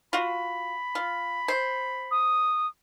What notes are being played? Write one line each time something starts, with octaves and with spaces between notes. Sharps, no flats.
F4 F#4 B5
F4
C5
D#6